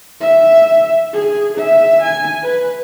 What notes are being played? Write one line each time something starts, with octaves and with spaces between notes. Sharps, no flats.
E5
G#4
E5
G#5
B4